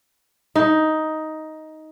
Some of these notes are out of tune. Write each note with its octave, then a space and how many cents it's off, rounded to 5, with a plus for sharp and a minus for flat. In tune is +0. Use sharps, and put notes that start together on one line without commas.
D#4 +10